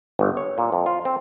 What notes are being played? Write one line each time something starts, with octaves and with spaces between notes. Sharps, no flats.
G1
C#5
A#2
F2
F4
C4